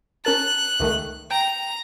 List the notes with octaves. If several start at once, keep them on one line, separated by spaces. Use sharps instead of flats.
C#4 A#4 A5 F#6
C#2 D#3 A3
G5 A#5